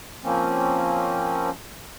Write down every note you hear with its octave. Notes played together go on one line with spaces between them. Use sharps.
F3 A#3 C4 C#4